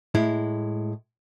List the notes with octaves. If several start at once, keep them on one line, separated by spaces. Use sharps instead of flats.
A2 G#3 E4